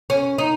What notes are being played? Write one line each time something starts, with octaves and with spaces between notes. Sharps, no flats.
C#4
D#4